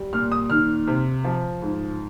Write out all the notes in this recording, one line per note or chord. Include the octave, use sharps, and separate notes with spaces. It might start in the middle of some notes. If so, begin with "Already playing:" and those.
Already playing: G3
A#2 F6
D#6
D#3 F6
C3
F3
G#2